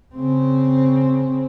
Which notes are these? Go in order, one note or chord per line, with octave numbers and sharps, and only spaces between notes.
C#3 C4